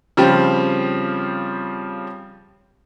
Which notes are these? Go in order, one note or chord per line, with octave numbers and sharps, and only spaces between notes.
C#3 F3 G3 C4 G4